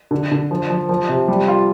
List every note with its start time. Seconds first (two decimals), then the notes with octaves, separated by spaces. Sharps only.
0.11 D3
0.32 D3
0.51 F3
0.70 F3
0.89 F3
1.09 C3
1.28 G3
1.48 F4